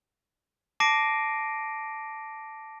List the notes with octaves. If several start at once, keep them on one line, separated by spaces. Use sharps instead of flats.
A5 D6 A#6 C7 D7 D#7